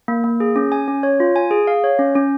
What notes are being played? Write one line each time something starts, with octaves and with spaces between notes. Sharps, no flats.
A#3
A#3
G#4
C#4
G#5
C#4
C#5
F4
G#5
G#4
F5
C#5
C#4
C#4